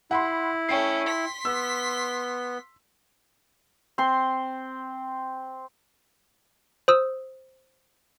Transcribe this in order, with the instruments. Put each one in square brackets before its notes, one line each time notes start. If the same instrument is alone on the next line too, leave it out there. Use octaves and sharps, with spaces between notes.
[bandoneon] E4 [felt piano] F#5 B5 C6
[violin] A3 C#4 [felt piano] G5 C7
[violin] C6 B6
[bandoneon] B3 [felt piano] E6
[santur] C4 C6
[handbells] C5 D#6 E6